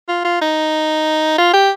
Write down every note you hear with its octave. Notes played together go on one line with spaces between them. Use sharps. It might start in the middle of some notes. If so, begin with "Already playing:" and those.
F4
F4
D#4
F4
G4